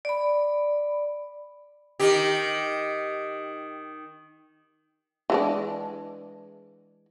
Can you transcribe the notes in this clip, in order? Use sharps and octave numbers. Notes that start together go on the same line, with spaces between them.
D5 B5
D#3 G4
E3 G#3 D4